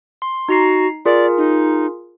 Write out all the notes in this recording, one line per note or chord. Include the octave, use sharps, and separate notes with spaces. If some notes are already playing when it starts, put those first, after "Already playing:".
C6
D#4 F#4 A#5 C7
F4 G#4 A#4 D5
D#4